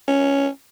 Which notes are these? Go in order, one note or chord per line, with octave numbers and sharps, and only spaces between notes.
C#4